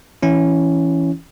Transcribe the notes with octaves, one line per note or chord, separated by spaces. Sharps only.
E3 C#4 E4